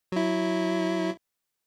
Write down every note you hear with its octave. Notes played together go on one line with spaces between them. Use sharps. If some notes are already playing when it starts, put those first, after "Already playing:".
F#3 E4